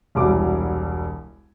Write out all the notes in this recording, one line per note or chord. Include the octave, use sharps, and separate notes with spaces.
E1 C2 G3 D6